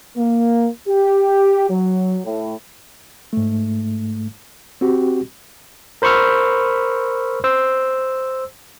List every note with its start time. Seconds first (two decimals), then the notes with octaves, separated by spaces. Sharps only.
0.16 A#3
0.88 G4
1.70 F#3
2.25 A2
3.33 G#2 A3
4.81 C4 F#4 G4
6.02 A#4 C5 B5 C#6 E6 F6
7.44 C5 E6